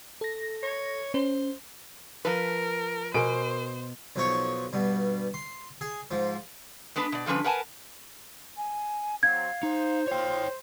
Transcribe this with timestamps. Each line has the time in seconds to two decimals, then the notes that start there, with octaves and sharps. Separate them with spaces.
0.21 A4 A#6
0.63 C#5
1.14 C#4 C5
2.25 F3 A#4 B4
3.14 B2 A#4 C5 G#5 D7
4.16 B1 F2 D#4 C#5 C#6
4.73 G2 B2
5.34 C6
5.81 G#4
6.11 G#2 F3
6.96 G#3 B3 D4 B4
7.12 B2 D5
7.26 D3 F3 G3 C#4 B4
7.44 A#4 B4 F#5 G#5 A5
8.57 G#5
9.23 F#3 C4 F5 G#6
9.63 D#4 C5
10.07 F4 C#5 G5